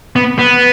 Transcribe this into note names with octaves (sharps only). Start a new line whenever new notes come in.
B3
B3